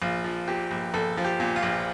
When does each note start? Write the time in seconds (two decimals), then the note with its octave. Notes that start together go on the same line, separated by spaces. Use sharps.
0.02 A#1 F4
0.24 F3
0.48 A#2 G4
0.71 A#1
0.94 A#1 A4
1.17 F3
1.25 G4
1.40 A#2
1.56 F4
1.63 A#1